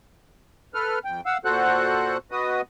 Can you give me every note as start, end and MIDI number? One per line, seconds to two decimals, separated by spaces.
0.74 0.99 69
0.74 0.99 71
0.74 0.99 89
1.05 1.21 41
1.05 1.21 79
1.26 1.38 77
1.26 1.38 78
1.26 1.38 88
1.45 2.17 46
1.45 2.17 66
1.45 2.17 69
1.45 2.17 72
1.45 2.17 78
1.45 2.17 90
2.31 2.61 59
2.31 2.61 66
2.31 2.61 71
2.31 2.61 75
2.31 2.61 87